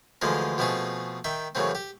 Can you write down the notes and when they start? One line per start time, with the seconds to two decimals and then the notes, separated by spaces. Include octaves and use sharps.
0.21 D2 D3 E3 F3 G#3 A#4
0.58 B2 F3 A3 C4 G#4
1.24 D#3 E5 G5
1.55 F#2 C#3 E3 A3 C4
1.75 G4